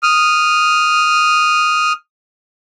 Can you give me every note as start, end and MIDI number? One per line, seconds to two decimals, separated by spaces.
0.03 1.93 87
0.03 1.93 89